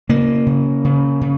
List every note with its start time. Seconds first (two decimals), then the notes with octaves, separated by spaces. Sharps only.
0.09 C#3 A#3
0.46 C#3
0.84 C#3
1.21 C#3